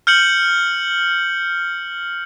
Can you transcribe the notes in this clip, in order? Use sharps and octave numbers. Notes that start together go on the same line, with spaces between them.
F6 G6 C#7 F#7